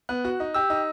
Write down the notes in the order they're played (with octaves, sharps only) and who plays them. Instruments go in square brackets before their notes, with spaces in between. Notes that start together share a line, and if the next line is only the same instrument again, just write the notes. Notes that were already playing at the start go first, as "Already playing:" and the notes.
[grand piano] B3 [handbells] F#6
[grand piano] F#4
D#4
[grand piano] G4 [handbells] E6
[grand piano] D#4